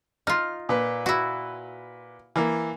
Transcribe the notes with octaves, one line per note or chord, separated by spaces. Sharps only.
D#4 F4 F6
A#2 B4
E4 F#4
E3 A#3